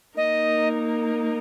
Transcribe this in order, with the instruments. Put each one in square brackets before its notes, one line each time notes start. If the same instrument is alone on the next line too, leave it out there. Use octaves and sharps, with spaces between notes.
[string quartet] A#3 D#4 A#4 [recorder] D#5